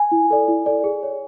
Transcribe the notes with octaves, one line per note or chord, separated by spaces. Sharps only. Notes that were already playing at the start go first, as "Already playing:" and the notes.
Already playing: G#5
E4
A4 D5
E4
A4 D5
G#4
C#5